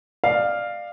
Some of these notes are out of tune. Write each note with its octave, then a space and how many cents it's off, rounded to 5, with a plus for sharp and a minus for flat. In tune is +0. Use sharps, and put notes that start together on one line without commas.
D5 +25 F5 +0